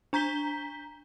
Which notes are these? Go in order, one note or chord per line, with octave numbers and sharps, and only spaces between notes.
D4 A#5 G6 B6 G7